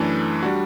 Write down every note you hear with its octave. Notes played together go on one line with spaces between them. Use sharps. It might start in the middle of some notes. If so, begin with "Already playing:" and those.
Already playing: F#2 E3 A3 D4 A4
G3 D4 F#4